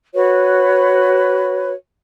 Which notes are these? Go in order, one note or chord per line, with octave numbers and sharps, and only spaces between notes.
F#4 B4 C#5